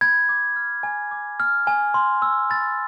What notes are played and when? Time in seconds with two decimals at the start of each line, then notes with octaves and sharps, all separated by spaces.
0.01 B5 G#6
0.29 D6
0.56 F6
0.83 G#5
1.11 D6
1.40 F6
1.67 G#5
1.94 C6
2.22 E6
2.50 B5 A6